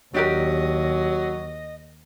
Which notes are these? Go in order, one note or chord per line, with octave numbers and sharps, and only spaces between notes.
D#2 F#3 D4 G4 A#4 D#5